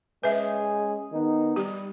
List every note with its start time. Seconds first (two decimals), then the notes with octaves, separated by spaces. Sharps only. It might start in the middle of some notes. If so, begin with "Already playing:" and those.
0.23 G#3 C#4 G#4 B4 E5
1.12 D#3 B3 D#4
1.56 G3 G4